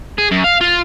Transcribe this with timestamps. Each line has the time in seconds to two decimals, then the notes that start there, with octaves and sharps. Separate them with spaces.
0.19 G#4
0.31 F#2
0.44 F5
0.61 F4